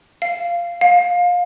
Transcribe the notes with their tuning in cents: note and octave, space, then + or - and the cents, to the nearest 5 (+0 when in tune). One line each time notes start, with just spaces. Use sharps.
F5 -10
F5 +25